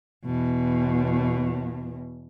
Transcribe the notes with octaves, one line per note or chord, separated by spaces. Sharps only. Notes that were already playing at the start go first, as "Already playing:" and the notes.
E2 B2